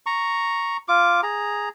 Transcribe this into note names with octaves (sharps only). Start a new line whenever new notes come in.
A#5 C#6
F4 D6
G#4 A#5